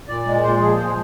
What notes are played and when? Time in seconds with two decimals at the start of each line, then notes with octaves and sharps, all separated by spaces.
0.08 A#2 D5
0.26 G#3
0.43 A#2 C5
0.60 F3 G#4
0.77 G#3 C5